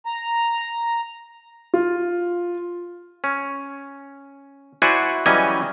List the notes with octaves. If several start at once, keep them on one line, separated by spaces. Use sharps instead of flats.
A#5
F4
C#4
E4 F#4 C5 D5 F#5 G#5
E3 F#3 G3 C#4 D#5 G#5